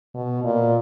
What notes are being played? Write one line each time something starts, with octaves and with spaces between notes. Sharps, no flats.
B2
A#2